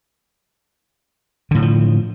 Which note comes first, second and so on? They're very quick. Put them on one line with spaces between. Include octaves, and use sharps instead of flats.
D3 A2 F#3 F3